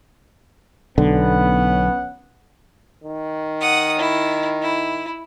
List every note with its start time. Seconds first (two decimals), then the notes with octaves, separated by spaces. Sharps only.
0.98 B1 D3 B3 C#4 F#5
3.04 D#3
3.60 F#5 D#6
3.98 E4
4.61 E4